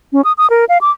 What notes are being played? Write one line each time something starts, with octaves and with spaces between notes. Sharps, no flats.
C#4
D#6
D#6
A#4
F5
D6